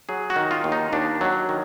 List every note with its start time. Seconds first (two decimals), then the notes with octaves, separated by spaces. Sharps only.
0.09 F#3 G#4
0.30 F#4
0.36 D#3
0.51 F4
0.64 D#2
0.72 D#4
0.93 D#2 D4
1.21 F#3
1.49 D#3